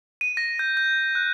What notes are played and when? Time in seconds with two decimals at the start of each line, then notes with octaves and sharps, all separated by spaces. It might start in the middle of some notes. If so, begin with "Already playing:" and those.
0.21 D#7
0.37 A#6
0.59 G6
0.77 G6
1.15 F#6